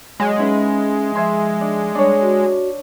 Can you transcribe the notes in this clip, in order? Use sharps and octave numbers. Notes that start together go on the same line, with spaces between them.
F#3 G#3 G#4
C#4 D#4 E4 B4
F3 E5 G#5 C6
D4
G3 D4 C#5
F#4